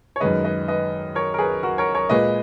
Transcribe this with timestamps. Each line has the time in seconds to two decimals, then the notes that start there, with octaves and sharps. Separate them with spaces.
0.16 C#5
0.20 F#2 D#3 G#3 B4 D#5
0.44 B4 D#5
0.68 B4 D#5
1.15 A#4 C#5
1.34 A#4
1.39 G#4 B4
1.63 F#4 A#4
1.78 A#4 C#5
1.94 A#4 C#5
2.09 A#2 G#3 B4 D#5